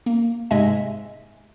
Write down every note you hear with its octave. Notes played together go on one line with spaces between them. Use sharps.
A#3
G#2 C3 G#3 D#5 E5 G#5